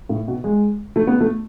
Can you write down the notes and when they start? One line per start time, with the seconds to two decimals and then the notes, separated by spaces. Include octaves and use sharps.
0.09 A2
0.28 B2
0.44 G#3
0.96 A3
1.07 B3
1.20 A3